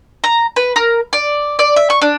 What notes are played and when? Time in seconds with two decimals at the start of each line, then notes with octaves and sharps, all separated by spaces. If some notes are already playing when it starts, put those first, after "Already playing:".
0.24 A#5
0.56 B4
0.76 A#4
1.13 D5
1.59 D5
1.76 E5
1.90 C#6
2.01 D4